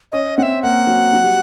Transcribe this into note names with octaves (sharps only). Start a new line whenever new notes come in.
C#4 D#5
C4 F#5
E5
A#3 F#5
F#3
F#3
G3